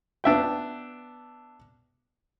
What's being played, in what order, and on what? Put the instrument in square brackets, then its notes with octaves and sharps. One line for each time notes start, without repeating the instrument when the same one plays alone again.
[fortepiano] B3 D4 E5 G5